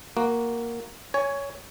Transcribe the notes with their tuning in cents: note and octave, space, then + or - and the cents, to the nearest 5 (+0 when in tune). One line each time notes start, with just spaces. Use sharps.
A#3 +0 F#4 +0
C#5 +15 G#5 +0